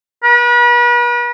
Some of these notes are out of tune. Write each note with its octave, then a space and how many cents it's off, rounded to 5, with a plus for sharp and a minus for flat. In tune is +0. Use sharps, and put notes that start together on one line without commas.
B4 -40